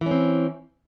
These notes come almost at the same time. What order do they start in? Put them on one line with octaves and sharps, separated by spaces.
E3 C#4 C4